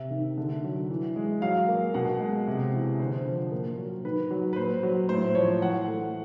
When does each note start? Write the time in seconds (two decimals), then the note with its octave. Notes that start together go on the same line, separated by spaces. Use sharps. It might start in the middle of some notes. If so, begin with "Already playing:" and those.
Already playing: C3 E5
0.11 D#3
0.37 D3
0.64 F#3
0.90 E3
1.16 G#3
1.42 F#3 F5
1.68 A#3
1.94 B2 F#5
2.20 G#3
2.48 C3
2.73 E3
2.99 D3 C5
3.25 F3
3.52 A#2 A#4
3.78 F#3
4.04 D#3 B4
4.30 F#3
4.53 B4
4.56 A#2 C5
4.83 F#3
5.09 A2 C5
5.35 F3 C#5
5.62 E3 F#5
5.87 A3